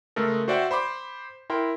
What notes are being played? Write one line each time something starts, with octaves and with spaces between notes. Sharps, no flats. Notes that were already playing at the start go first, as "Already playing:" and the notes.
C#3 G#3 A3 A4 A#4
F#4 C5 D5 E5 F#5 G5
C5 B5 C6 D6
E4 A#4 G5 C6